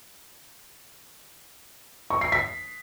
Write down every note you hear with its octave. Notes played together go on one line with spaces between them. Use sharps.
C#6
C7
B6